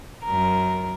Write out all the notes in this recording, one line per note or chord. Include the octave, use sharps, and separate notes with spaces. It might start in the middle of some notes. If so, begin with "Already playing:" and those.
F#2 A#4